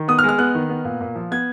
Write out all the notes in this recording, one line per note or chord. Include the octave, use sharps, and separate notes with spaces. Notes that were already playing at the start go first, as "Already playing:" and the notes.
Already playing: D#3
B3 D#6
F6
G#3
F6
B3 F#6
D#3
B3
A#2
A#2
F3
B3 G#6